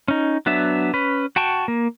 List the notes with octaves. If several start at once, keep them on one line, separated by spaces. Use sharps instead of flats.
C#4 D#4
F#3 B3 D4 E5
C#4 B4
F#4 G5 A5 C#6
A#3